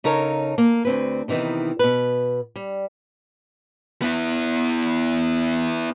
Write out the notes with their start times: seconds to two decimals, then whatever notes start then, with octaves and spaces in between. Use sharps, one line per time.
0.04 C#3 D#4 A4 A#4 C#5
0.58 A#3
0.85 D2 C4 B4
1.28 C3 D#3 E3 B3 D#4
1.79 B2 B4
2.56 G3
4.02 B3 E4